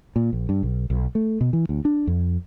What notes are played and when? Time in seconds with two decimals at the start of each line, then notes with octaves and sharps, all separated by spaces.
0.16 A#2
0.33 A#1
0.49 G2
0.63 B1
0.90 B1
1.15 A3
1.41 B2
1.53 E3
1.69 D2
1.85 D4
2.07 F2